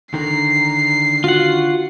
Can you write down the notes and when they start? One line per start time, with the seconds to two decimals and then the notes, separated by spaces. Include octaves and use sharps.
0.14 D3 D#3 A#5 C7
1.24 F4 F#4 F#5